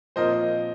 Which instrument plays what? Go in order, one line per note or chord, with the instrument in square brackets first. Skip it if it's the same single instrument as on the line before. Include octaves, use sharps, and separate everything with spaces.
[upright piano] A#2 F3 C4 F4 A#4 [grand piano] C5 D#5